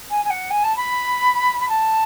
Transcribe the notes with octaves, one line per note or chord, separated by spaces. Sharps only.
G#5
G#5
F#5
G#5
A5
B5
B5
A5